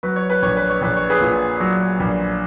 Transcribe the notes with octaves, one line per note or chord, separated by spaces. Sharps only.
F#3 B4
C#5
B4
A#1 C#5
B4
C#5
A#1 B4
C#5
G#4 B4
A#2
F#3
A#1